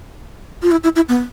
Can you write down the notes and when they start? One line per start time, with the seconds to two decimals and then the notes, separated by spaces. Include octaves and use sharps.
0.62 F4
0.71 E4
0.83 E4
0.96 E4
1.09 B3